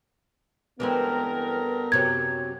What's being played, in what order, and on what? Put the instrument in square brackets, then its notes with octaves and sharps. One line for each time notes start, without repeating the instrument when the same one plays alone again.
[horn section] G2 A4 A#4 [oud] E3 G#3 C4 [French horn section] B3
[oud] F#2 C3 F#3 [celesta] G#6